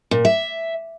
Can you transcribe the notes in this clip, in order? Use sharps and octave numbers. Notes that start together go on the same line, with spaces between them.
A#2
E5